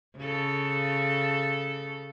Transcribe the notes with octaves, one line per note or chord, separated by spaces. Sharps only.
C#3 A4